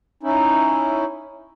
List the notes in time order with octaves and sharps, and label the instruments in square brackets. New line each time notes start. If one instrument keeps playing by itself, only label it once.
[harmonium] C#4 D#4 E4